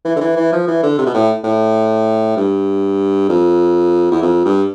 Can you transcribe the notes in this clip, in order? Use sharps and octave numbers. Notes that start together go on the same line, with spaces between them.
E3
D3
E3
E3
F3
E3
D3
C3
B2
A2
A2
G2
F2
E2
F2
G2